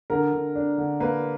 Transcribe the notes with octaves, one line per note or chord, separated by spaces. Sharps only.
D3 A#4
D3
D4
D3
A#3 B4